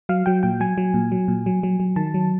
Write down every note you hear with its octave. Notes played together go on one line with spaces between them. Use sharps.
F#3 F5
F#3 G5
A#2 G5
F#3 G#5
F#3
A#2
F#3
A#2
F#3
F#3
F#3
D#3 A5
F#3